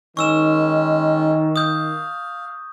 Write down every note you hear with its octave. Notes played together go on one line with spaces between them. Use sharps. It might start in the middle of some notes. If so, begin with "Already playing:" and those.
D#3 G#3 C#4 C#6 E6 E7
F5 D#6 G6